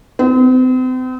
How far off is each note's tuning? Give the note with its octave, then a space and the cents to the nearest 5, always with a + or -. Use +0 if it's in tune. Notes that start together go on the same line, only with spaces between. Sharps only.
C4 -40